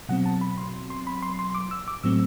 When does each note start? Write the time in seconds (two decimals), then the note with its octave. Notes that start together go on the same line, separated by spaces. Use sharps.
0.09 B2 F#3 C4 F#5
0.26 A5
0.41 B5
0.58 C6
0.90 C6
1.07 B5
1.22 C6
1.39 C6
1.50 C6
1.55 D6
1.71 E6
1.88 D6
2.03 A2 F#3 A3 C4 E6